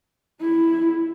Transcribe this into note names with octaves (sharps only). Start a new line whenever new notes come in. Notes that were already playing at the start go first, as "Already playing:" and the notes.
E4